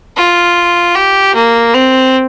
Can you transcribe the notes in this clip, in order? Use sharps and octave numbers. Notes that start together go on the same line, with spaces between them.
F4
G4
A#3
C4